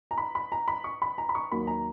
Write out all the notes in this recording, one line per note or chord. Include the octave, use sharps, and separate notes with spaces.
A#5
B5
B5
A#5
B5
C#6
B5
A#5
B5
C#6
D#2 D#3 F#3 A#3 B5
A#5